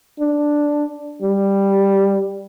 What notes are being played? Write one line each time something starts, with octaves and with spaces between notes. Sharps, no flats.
D4
G3